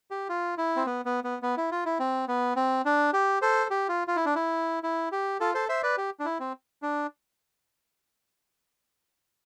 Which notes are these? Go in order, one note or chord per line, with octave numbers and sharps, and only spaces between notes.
G4
F4
E4
C4
B3
B3
B3
B3
E4
F4
E4
C4
B3
C4
D4
G4
A4 C5
G4
F4
F4
E4
D4
E4
E4
G4
F4 A4
A4 C5
C5 E5
B4 D5
G4
D4
E4
C4
D4